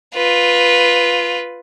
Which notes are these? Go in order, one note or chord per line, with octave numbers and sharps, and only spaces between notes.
F4 B4